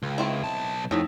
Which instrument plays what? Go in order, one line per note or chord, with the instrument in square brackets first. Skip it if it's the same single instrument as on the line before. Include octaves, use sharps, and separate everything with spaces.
[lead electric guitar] C#2
[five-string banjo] D#3 C4 E4
[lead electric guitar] B1 A5
[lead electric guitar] F2 [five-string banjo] F#3 [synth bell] A3 D#4 E4